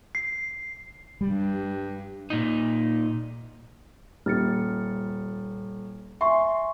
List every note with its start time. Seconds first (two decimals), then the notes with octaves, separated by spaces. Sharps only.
0.15 C7
1.21 G2 G3
2.30 A#2 D#4
4.26 D#1 F6 A6 C#7
6.21 E5 G#5 C6 C#6